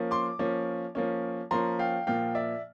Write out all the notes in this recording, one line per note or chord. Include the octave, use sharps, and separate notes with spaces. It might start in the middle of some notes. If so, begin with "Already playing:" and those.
Already playing: F3 A#3 C#4
C6 D6
F3 A#3 C#4
F3 A#3 C#4
F3 A#3 C#4 A#5 C6
F5 G5
A#2 F3 A#3 F5 G5
D5 E5